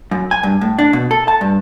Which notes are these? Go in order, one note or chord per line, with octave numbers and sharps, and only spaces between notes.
F#2
G#5
G2
A2
D4
B2
A4
A5
G2